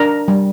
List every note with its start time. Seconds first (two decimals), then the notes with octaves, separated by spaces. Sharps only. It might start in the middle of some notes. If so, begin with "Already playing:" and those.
Already playing: D4 A#4 A#5
0.28 G3